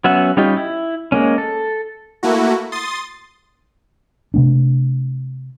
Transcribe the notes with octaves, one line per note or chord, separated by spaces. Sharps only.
F#3 B3 C#4 E5 F#5
G3 C#4 D#4 F4 G4
E4
G#3 A#3 C#4
A4
A3 A#3 E4 F#4
C6 D#6 A6
C3 A3 D4